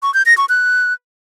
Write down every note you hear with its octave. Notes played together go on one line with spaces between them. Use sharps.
C#6
G6
A#6
C#6
F#6